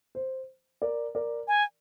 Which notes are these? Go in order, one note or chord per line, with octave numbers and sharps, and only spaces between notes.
C5
A#4 D5
A#4 D5
G#5